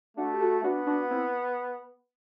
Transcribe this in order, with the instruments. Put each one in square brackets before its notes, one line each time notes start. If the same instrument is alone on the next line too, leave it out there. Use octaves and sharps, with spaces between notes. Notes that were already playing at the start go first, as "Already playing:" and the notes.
[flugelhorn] A3 [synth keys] D4 F#4
[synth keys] G4
F#4 A4
[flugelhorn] B3 [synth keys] D4 F#4
[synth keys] D4 F#4
C4 E4